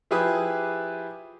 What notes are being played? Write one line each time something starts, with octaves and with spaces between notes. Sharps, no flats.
F3 E4 G4 G#4 B4 D#6